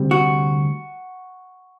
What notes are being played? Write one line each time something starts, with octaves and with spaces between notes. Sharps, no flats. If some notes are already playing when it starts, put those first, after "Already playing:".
Already playing: D2 C3 G3
F#4